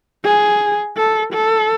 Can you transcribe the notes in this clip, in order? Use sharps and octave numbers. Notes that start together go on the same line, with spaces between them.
G#4
A4
A4